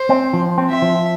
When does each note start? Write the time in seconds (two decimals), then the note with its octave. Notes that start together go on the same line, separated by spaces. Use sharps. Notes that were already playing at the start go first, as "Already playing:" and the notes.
Already playing: C5
0.09 C4
0.33 F3
0.58 C4
0.70 E5
0.82 F3